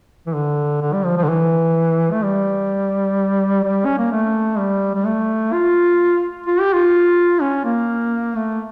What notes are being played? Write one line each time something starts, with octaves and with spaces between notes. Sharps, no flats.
E3
D3
D3
G3
F3
F3
D3
E3
A3
G3
G3
C#4
A#3
A3
G3
G3
A3
F4
F4
G4
F4
C#4
A#3
A3